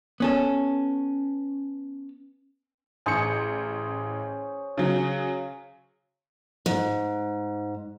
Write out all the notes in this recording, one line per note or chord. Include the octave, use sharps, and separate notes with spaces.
B3 C#4 A4
A1 C#4 G#4 C5 C#7
C#3 F#3
G#2